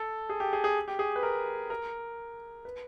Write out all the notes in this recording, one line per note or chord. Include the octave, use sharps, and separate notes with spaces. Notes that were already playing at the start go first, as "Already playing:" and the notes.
Already playing: A4
G#4
G4
G#4
G#4
G4
G#4
B4
A#4
A#4
B4